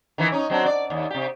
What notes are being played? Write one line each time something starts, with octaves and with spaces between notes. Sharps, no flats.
D#3 E3 E4
C#4 D#4
F#3 C4 D4
D5
D#2
C3 G4